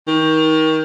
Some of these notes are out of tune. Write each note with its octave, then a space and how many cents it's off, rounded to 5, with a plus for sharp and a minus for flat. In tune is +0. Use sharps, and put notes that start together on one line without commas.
D#3 +25